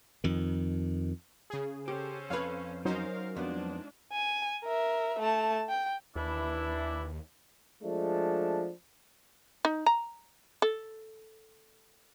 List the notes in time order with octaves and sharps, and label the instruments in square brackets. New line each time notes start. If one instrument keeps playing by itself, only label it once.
[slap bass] F2 D#3
[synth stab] C#3 G#4
[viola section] C#4 A4 C5 [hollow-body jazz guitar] G4
[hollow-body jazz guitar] F2 B4 [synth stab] C#5 F5
[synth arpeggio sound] F#3 [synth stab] C#4 D#4 C5 [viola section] F4 A#4 F5
[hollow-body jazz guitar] F2 B3 [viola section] G#3 D4 F4
[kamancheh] G#5
A#4 E5
A3 A5
G5
[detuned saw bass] D#2 [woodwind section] E3 D4 E4
[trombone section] F3 G#3 A3 D4
[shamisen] D#4
A#5
A4